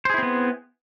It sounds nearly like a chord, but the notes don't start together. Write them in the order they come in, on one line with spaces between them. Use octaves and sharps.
C5 G#4 E4 C4 B3